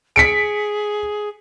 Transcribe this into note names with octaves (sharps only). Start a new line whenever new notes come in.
G#4 B6 C#7 D7